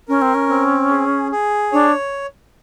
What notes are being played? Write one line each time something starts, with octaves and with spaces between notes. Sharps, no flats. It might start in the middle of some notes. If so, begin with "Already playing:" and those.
C#4 A#4
C4
C#4
C4
G#4
G#4
D4 C#5